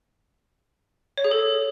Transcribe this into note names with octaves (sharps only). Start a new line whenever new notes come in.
C#5
G#4
A4